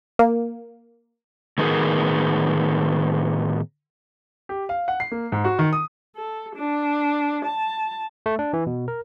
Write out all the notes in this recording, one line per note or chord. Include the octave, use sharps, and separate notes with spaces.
A#3
A2 D#3 B3 C4 G#4 A#4
G4
F5
F#5
C7
A#3
G#2
F#4
D#3
D#6
A4
D4
A5
A3
D4
E3
B2
A#4